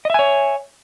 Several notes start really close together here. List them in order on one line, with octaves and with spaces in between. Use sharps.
D#5 E5 G#5 C#5